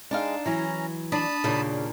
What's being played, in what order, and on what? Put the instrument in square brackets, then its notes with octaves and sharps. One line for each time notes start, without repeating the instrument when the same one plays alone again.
[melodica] G#3 [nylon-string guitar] D4 D#4 F5
[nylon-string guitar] E3 F#3 [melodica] C#4 A#5
[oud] D4 [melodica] A5 B5 D#6
[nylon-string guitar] D#2 A#2 D4 [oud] C#3